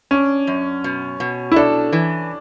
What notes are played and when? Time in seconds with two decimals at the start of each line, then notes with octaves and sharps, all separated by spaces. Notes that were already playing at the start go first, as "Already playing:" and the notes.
0.11 C#4 D4
0.47 F#2
0.84 B2
1.20 B2
1.52 E4
1.56 D4 A4
1.92 E3